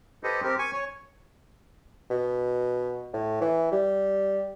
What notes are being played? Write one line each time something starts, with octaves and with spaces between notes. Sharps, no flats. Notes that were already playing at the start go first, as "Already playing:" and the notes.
G4 A4 B4 C5 D#5
C4 G4 A#4
G#5 C#6
C#5
B2
A2
E3
G3